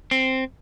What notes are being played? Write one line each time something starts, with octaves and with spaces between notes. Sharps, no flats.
C4